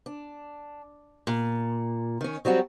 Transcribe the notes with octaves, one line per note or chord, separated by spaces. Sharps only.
D4
A#2
D#3 C#4
F#3 G3 C4 F#4